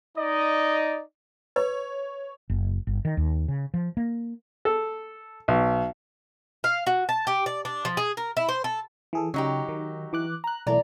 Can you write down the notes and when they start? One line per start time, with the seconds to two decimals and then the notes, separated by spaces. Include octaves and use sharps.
0.17 D#4 D5 D#5
1.56 B4 C#5
2.50 F#1
2.87 G1
3.05 D#3
3.17 D#2
3.48 C#3
3.74 F3
3.97 A#3
4.65 A4
5.48 B1
6.64 F5
6.87 F#4
7.09 A5
7.27 G4
7.46 D5
7.65 D4
7.85 F3
7.97 G#4
8.17 A#4
8.37 E4
8.49 C5
8.64 A4
9.13 E3 G#4 A4
9.34 C#3 F#3 D#4 G4
9.69 D#3
10.13 E3 D6 F#6
10.44 A#5 F#6
10.67 B1 E3 A3 D5 A#5